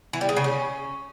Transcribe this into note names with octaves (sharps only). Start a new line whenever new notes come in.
E3
G3
G#3
C#3
C#4